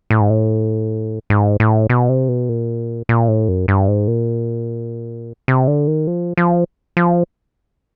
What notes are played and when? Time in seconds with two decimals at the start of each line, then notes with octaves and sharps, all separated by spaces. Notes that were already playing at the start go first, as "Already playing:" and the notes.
0.10 A2
0.21 G#2
0.30 A2
1.30 G#2
1.60 A2
1.90 B2
2.09 C3
2.29 B2
2.49 A#2
3.09 A#2
3.28 A2
3.49 F#2
3.68 G2
3.88 G#2
4.08 A#2
5.48 C3
5.68 D3
5.87 D#3
6.07 F3
6.37 F3
6.97 F3